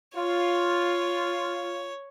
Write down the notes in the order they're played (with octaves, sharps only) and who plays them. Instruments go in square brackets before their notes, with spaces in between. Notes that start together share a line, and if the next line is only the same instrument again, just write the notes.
[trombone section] F4 [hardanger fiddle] C#5